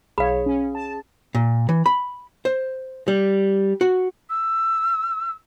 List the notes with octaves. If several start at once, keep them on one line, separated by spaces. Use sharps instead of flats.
B1 G#4 C#5 F5 B5
C#4
A5
A#2
E3
B5
C5
G3
F#4
E6